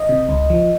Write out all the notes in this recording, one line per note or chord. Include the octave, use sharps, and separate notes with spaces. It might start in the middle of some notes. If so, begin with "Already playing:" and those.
Already playing: D#5
C3
C#2
F3